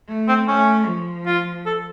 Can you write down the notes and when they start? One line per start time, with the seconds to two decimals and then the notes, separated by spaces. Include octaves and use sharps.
0.09 A3
0.28 C4
0.47 A3 C#4
0.87 F3
1.26 F4
1.66 A4